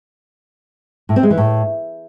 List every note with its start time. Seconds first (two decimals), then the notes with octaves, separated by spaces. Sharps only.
1.09 A2
1.16 C4
1.23 G#3
1.30 E3
1.38 A2